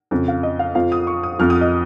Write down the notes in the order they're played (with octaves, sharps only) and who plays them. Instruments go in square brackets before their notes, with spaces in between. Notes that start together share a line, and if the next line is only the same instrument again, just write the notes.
[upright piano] F2 C#3 F3
F5
D#5
F5
F2 F3 F5
D#6
C#6
D#6
F2 F3 F6
D#6
D#5